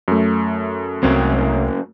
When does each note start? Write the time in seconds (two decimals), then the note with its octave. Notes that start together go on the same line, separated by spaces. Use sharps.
0.08 F#2 A3
1.03 C2 C#3 F#3 A#3 C4